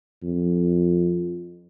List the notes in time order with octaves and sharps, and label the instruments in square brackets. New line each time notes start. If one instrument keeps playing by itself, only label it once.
[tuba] F2